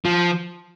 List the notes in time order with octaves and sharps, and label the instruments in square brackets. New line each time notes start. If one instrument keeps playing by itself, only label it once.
[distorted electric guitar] F3